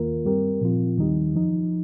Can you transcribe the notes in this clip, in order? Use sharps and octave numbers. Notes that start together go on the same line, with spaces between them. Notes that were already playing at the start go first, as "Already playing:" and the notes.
Already playing: D#2 D#3 A#3 F4 A#4
G2 G3 C4 G4 A#4
A#2 F3 C4 F4
D#2 D#3 G3 D#4 G4
F2 F3 D#4